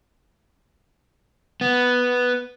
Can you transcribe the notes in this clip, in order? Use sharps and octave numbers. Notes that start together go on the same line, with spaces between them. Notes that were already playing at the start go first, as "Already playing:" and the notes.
B3